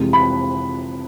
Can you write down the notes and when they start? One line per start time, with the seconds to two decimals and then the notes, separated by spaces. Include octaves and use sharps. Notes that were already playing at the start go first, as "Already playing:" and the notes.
Already playing: F2 C3 E3 G#3
0.13 B5